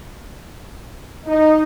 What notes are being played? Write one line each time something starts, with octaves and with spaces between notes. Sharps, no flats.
D#4